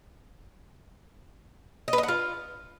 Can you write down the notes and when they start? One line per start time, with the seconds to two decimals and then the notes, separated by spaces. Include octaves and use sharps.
1.88 D#5
1.93 B4
1.98 D#5
2.03 F#5
2.08 F4